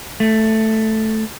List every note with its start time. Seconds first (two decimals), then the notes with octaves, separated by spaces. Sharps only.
0.20 A3